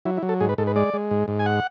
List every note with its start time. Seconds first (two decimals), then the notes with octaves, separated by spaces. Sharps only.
0.05 F#3 E4
0.17 E4
0.23 F#3
0.29 A4
0.40 G#2 G#4
0.49 B4
0.58 G#2 A4
0.67 B4
0.76 G#3 D5
0.94 G#3
1.11 G#2
1.28 G#2
1.39 G#5
1.46 F#5